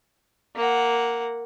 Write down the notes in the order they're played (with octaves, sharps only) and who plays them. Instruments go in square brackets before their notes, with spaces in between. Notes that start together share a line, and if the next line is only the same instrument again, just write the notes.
[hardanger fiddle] A#3 F#5